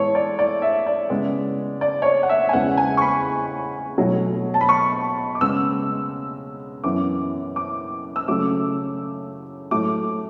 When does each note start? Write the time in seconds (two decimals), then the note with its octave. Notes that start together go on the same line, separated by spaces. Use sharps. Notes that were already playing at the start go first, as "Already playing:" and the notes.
Already playing: A2 E3 G#3 B3 A4 C#5
0.15 D5
0.39 D5
0.62 E5
0.87 D5
1.10 C#3 G#3 B3
1.81 D5
2.02 C#5
2.06 D5
2.23 F#5
2.29 E5
2.49 G#5
2.53 E2 C#3 G#3 B3 F#5
2.77 G#5
2.97 C#6
3.02 B5
3.98 B2 F#3 A3
4.54 A5
4.61 B5
4.69 C#6
5.35 D6
5.41 C#3 G#3 B3 E6
6.84 F#2 E3 B3 D6
7.56 D6
8.16 E6
8.28 C#3 F#3 A3 D6
9.71 A2 F#3 A3 D6